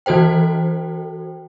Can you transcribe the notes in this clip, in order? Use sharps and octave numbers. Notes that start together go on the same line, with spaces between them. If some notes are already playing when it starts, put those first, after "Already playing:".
E3 F#4 A4 C5 G5